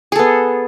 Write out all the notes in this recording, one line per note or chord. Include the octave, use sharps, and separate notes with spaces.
B3 G#4 A4